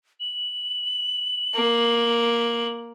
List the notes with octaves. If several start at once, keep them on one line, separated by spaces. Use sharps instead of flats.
F#7
A#3